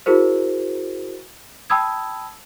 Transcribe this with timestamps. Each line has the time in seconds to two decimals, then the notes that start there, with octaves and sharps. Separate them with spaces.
0.06 E4 F#4 G#4 A#4 C5
1.70 G5 A5 B5 D#6 E6 G#6